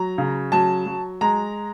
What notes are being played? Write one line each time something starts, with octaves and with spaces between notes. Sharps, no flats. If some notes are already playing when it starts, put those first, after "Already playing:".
Already playing: F#3 A#5
C#3
F#3 A5
F#3
G#3 A#5